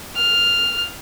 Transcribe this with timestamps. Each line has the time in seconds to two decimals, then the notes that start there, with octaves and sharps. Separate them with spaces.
0.16 F6